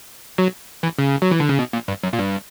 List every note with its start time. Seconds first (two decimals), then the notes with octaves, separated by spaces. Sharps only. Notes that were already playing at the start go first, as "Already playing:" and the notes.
0.38 F#3
0.83 E3
0.99 C#3
1.22 F#3
1.31 E3
1.40 D3
1.49 C#3
1.59 B2
1.73 A#2
1.88 G2
2.03 F#2
2.13 A#2
2.19 G2